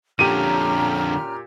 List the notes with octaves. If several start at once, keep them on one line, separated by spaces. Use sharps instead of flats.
F2 A#2 D3 C#4 G4 A#5 F6 D#7